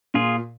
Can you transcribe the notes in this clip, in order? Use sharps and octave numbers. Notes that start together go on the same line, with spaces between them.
A#2 F4 G#4